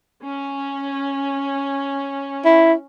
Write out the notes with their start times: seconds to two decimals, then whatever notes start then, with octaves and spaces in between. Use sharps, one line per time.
0.24 C#4
2.45 E4